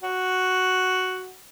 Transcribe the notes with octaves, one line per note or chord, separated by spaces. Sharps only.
F#4